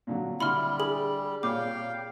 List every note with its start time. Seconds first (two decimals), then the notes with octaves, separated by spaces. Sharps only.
0.07 A#2 D3 F#3
0.40 D3 G3 E4 B5 C6 F6
0.80 G#4 F#7
1.43 A#2 C#5 F5 G5 D6